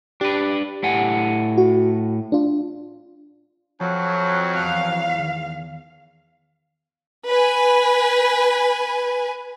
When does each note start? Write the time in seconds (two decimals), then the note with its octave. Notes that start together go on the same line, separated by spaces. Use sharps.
0.21 D4 G4 B4
0.83 A2 F#5 G#5
1.58 F#4
2.32 D4 F4
3.80 F2 F3 F#3
4.55 E2 F5
5.20 D#3
7.28 B4 G#5